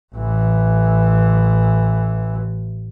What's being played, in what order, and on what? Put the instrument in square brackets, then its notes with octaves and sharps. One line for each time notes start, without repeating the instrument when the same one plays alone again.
[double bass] A1 E3